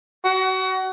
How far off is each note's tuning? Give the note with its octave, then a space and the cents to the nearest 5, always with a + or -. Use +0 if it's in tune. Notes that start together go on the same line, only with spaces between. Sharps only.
F#4 +30